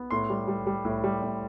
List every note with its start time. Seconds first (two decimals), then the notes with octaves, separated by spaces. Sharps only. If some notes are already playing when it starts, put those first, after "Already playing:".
Already playing: B3
0.11 A2 C6
0.30 G3
0.48 G3
0.67 G3
0.85 A2
1.04 G3
1.23 A2